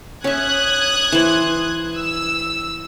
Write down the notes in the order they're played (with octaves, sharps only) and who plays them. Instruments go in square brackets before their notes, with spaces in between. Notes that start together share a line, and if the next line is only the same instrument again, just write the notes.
[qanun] C#4 E5 [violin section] D#6 F#6 G#6
[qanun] E3 C5
[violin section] E6